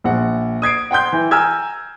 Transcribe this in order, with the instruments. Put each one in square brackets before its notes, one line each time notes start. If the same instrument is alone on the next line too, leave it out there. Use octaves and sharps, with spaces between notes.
[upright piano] A#1 F#5
D#6 G#6 C7 D7
F#5 G5 C6 G6
E3
G#5 A#5 E6 F6 G#6